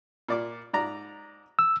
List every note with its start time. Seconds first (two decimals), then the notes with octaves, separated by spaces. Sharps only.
0.28 A#2 D5 D6
0.73 G#2 D5 A#5
1.59 E6